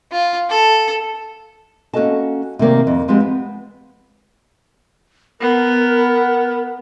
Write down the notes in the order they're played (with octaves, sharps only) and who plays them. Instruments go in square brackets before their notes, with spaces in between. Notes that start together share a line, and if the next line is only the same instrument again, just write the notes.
[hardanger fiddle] F4
A4
[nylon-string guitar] A#3 C#4 F#4 A4 D#5 A5
C3 D#3 A#3 D5
F2
F3 G#3 B3 C4 G4
B3
[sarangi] B3 [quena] A#4